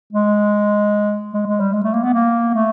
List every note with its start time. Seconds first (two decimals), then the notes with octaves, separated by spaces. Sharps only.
0.13 G#3
1.34 G#3
1.47 G#3
1.60 G3
1.73 G#3
1.83 A3
1.94 A#3
2.04 B3
2.13 A#3
2.54 A3